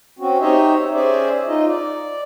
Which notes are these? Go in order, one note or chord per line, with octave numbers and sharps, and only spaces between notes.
C4 C#4 F#4
D#4 G4 C5 C#5 D#5 E5
C#4 G#4 C5 D5 E5
D#4 F4 D#5
D5